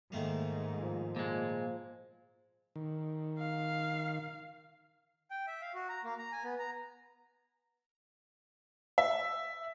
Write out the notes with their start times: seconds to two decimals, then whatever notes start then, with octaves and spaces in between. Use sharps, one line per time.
0.12 G#2 D#3 A3 A#3
0.78 F3
1.16 A#2 G#3
2.76 D#3
3.39 F5
5.31 G5
5.47 E5
5.61 F5
5.74 F#4
5.89 A#5
6.04 A#3
6.18 A#5
6.32 G#5
6.44 B3
6.59 A#5
8.98 E5